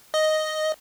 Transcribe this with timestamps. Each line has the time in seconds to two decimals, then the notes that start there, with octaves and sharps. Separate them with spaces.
0.14 D#5